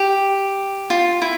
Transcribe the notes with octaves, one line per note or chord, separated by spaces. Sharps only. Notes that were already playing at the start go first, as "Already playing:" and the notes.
Already playing: G4
F4
E4